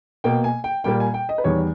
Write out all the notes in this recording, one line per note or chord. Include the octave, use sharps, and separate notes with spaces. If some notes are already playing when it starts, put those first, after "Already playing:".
B2 A#3 G5
G#5
G5
A#2 G3 A#3 G5
G#5
G5
D#5
B4
E2 D#3 G3 C#5